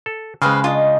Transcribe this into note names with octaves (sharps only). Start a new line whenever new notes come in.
A4
C#3 G#3 B4 C5 F5 G5
D4 F4 D#5